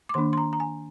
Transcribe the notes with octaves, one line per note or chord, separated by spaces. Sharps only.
D6
D#3 A#3 D4 C6
C6
A#5
A#5
G#5